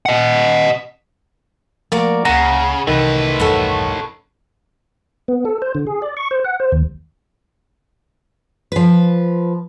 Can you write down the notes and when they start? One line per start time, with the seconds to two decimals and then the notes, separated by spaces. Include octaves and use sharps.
0.06 D#5 F#5
1.92 F3 A3 A#3 F#4 A#4 D5
2.25 C#2 C#3 A#3 F#5 A#5
2.87 C2 C3 D#3 E3 A3 B4
3.39 B1 E2 G2 A4 C#5 F#5
5.28 B3
5.45 A4
5.62 C5
5.75 D3
5.87 G#4
6.02 D5
6.17 C#6
6.31 C5
6.44 F#5
6.60 C5
6.72 D#2
8.72 F3 B4